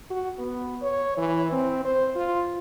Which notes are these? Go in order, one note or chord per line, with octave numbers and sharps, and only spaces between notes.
F#4
B3
C#5
E3
C4
C5
F4